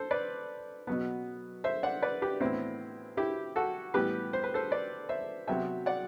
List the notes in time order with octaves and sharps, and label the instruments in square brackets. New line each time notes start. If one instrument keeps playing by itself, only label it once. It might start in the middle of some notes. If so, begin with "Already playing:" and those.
Already playing: [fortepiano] A4 C5
B4 D5
B2 F#3 B3
C5 E5
D5 F#5
B4 D5
G4 B4
A2 E3 B3 C4 E4
E4 G4
F#4 A4
A2 E3 G3 B3 G4 B4
C5
B4
A4 C5
B4 D5
C5 E5
C3 F#3 B3 E5 G5
D5 F#5